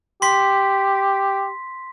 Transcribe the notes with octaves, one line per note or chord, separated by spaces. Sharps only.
G4 C6 B6